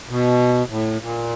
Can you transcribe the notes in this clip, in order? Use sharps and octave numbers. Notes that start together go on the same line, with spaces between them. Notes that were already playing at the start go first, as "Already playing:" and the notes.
B2
A2
A#2